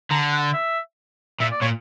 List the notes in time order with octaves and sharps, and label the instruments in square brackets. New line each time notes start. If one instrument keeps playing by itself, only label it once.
[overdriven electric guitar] D3 [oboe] A#5
[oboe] F#5
E5
[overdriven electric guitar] A#2 [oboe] E5
[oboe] D5
[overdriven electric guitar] A#2 [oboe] C#5